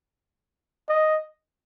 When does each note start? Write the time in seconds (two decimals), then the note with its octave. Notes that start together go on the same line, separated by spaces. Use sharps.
0.89 D#5